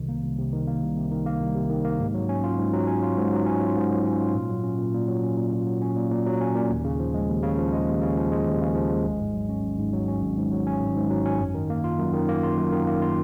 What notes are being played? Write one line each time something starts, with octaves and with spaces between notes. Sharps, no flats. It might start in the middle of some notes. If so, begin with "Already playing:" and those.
Already playing: C2 C3 D#3
A#3
C2
C3
D#3
A#3
C2
C3
D#3
A#3
C2
C3
D#3
A#3
G#2
F#3
C#4
F4
G#2
F#3
C#4
F4
G#2
F#3
C#4
F4
G#2
F#3
C#4
F4
A#2
F#3
C#4
A#2
A#2
F#3
C#4
A#2
A#2
F#3
C#4
A#2
A#2
F#3
C#4
A#2
D#2
C#3
F3
G#3
D#2
C#3
F3
G#3
D#2
C#3
F3
G#3
D#2
C#3
F3
G#3
G#1
G#2
F#3
C#4
G#1
G#2
F#3
C#4
G#1
G#2
F#3
C#4
G#1
G#2
F#3
C#4
F#2
D#3
A#3
F4
F#2
D#3
A#3
F4
F#2
D#3
A#3
F4